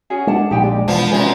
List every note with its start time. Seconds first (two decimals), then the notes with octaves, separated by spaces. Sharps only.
0.10 C#4 F#4 G#4
0.27 G#3 D4 F#5 A5
0.51 A#1 D#4 G4 G5 G#5
0.64 G#3 D5
0.88 E1 F3 B3 A5
1.12 F#2 C3 F3 B4 D#5 G#5